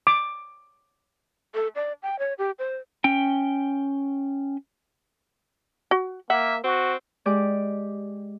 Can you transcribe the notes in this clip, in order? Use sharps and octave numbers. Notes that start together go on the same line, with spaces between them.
D6
A4
D5
G5
C#5
G4
C5
C#4 G5
F#4
A#3 E5 F#5
C4 F#4
G#3 G4 D5 D6